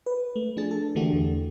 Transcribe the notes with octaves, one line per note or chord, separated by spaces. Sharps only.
B4
A3
F3 D4 G#4 A6
A4
D3 E3 A3 D4 F#4 G4
E2